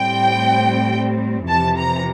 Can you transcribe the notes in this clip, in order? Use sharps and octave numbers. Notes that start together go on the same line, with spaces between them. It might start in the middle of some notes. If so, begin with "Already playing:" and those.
Already playing: A2 G3 C4 G5
F2 C3 E3 A5
A#5